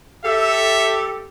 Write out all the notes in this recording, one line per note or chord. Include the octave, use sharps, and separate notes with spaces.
G4 A4 E5